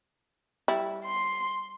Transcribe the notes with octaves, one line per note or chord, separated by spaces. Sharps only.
G3 E4
C6